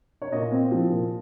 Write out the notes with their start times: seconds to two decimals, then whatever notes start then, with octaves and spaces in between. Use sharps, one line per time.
0.22 C#5
0.32 A#2 D#5
0.52 C4
0.72 F3
0.90 A#2